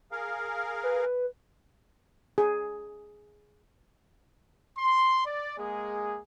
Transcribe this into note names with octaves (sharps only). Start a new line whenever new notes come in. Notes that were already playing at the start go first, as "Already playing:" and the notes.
G#4 A#4 F5
B4
G#4
C6
D5
G#3 A#3 G#4